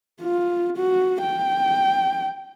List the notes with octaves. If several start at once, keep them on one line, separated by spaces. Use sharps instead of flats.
F4
F#4
G5